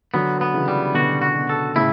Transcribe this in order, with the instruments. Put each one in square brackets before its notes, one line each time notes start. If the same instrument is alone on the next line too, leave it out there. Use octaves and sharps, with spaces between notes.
[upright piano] D3 F#3 [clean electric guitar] B3
[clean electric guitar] B3
[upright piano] C#3 E3
[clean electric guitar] G3
[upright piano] B2 D3 [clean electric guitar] F#4
[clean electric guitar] F#4
[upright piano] B2
[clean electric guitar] A4
[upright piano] A2 C#3 [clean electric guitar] E4